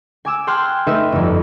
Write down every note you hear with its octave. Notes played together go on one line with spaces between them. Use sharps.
G#5 D6 E6
G5 A5 C6 F6 F#6 G#6
A3 D#4 B4 E5 E7
G1 F2